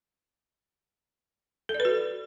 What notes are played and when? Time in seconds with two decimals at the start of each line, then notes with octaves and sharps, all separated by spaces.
1.69 A4
1.74 D5
1.80 B4
1.85 F#4